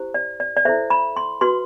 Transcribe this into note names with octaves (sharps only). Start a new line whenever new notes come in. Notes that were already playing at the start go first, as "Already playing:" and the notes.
Already playing: E4 G4 C5
D5
D5
D5
E4 A4 C5 E5
B5
C6
F#4 B4 C6